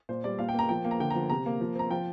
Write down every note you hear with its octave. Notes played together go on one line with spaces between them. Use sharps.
A#2 C5
G3 D5
A#2 F5
G5
A#3 A#5
F3 G5
A#3
A#5
D3 G5
A#5
F3
C3 A#5
A#3
F3
C4 A#5
F3 G5